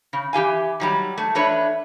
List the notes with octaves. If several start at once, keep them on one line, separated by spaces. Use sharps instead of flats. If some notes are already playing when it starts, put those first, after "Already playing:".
C#3
E3 G4 F5 G#5
D#3 F#3 G3
A3
E3 A3 D4 B4 C#5